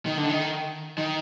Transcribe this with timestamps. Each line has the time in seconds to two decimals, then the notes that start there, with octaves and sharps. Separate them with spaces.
0.06 D#3
0.18 D3
0.30 D#3
0.98 D#3